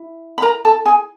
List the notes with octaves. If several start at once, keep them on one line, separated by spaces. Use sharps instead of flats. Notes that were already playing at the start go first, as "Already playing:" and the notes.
Already playing: E4
B5
A#4 A#5
A4 A5
G#4 G#5